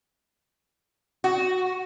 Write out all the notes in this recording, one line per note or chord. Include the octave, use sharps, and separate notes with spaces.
F#4